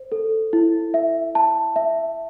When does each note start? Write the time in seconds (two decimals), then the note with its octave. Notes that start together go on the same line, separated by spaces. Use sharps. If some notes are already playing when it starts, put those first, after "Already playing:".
Already playing: C5
0.12 A4
0.53 E4
0.94 E5
1.35 A5
1.76 E5